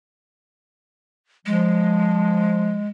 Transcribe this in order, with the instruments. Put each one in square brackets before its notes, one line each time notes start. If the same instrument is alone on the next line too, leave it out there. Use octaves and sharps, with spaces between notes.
[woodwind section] F3 [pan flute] G#3